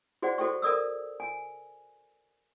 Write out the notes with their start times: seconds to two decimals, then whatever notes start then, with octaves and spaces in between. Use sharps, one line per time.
0.22 F#4 G#4 C5 D5 F#5
0.38 F#4 A4 C5 G5 C#6
0.62 A4 A#4 D5 D#6 E6
1.20 G#5